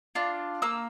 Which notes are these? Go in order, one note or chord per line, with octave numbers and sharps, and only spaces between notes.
D4 F4
A#3 E6